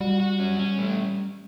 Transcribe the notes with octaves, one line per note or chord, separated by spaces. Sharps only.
G3 F#4
F#4
C#4
C#4
A3